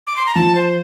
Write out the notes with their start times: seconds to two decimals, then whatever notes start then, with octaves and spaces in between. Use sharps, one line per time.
0.07 D6
0.16 C6
0.26 A#5
0.35 F3 A5
0.55 C5